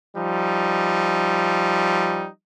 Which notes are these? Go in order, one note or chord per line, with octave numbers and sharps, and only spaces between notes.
F3 G3 D#4